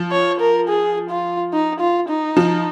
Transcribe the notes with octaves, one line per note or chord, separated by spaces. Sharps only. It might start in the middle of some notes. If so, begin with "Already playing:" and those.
Already playing: F3
C#5
A#4
G#4
F4
D#4
F4
D#4
F3